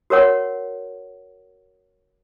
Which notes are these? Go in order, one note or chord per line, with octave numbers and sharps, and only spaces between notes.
F#4 A#4 C#5 F#5